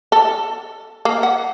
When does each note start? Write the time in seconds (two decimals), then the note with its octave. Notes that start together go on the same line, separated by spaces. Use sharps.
0.12 A4
1.05 A#3
1.23 F#5